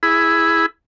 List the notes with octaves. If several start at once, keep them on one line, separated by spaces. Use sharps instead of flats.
E4 G#4 B5